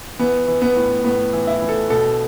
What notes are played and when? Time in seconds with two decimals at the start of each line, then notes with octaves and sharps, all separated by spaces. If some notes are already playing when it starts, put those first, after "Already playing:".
0.19 E3 B3
0.48 E3
0.62 B3
0.76 A2
1.04 A2 B3
1.33 E3
1.47 E4
1.61 E3
1.69 A4
1.90 B2 A4